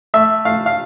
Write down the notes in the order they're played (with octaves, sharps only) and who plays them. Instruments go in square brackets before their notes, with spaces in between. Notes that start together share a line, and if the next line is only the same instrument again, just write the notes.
[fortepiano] A3 E5
A3 F5
F5